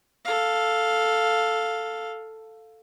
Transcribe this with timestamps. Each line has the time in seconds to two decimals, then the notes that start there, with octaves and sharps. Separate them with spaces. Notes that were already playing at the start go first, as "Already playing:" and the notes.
0.25 A4 F5